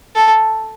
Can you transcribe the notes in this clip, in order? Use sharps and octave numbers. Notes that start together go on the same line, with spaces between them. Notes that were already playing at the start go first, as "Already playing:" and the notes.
A4